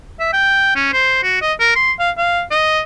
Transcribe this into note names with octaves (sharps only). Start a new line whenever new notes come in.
E5
G5
C#4
C5
F#4
D#5
A#4
C6
F5
F5
D#5